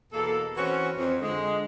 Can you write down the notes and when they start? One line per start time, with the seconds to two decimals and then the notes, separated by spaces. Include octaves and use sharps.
0.13 E2 B2 A#3 A4
0.57 E3 C4 C#4 F#4
0.97 F2
1.22 D3 G#3